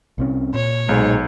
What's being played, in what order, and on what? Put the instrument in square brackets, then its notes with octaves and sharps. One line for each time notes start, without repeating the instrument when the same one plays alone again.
[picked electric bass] C2 C3 C#4
[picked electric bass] A#2 [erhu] C#5
[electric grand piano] B1 [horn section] G#2